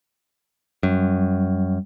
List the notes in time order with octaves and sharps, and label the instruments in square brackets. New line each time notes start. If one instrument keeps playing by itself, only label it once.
[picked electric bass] F#2 [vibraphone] G3